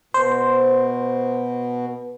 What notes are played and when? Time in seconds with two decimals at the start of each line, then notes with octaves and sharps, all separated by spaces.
0.14 B2 C5